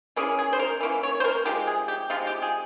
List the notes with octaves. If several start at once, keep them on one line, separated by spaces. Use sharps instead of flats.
E3 A#3 C#4 G#4
G#4
C5
A#4
E3 A#3 C#4
C#5
C5
A#4
C3 F3 G#3 G4
G#4
G4
C3 F3 G#3 F4
G4
G#4